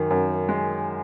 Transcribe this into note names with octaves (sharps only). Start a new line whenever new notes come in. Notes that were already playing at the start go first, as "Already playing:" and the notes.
Already playing: F#2 D#3
F#2
G#3